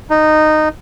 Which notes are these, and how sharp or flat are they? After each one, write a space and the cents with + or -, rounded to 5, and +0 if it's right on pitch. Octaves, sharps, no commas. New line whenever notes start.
D#4 -15